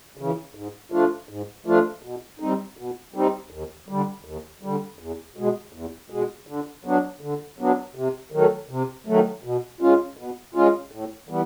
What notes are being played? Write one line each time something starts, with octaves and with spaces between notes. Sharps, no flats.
C#3 E3
G#2
F3 A3 D4 F4
G#2
F3 A3 D4 F4
B2
G3 C4 D#4
B2
G3 C4 D#4
D#2
D3 G3
D#2
D3 G3
E2
B2 G#3
E2
B2 G#3
D3
F#3 B3 D4
D3
F#3 B3 D4
C3
D#3 F#3 A3
C3
D#3 F#3 A3
B2
G#3 C#4 F4
B2
G#3 C#4 F4
A2
E3 G3 B3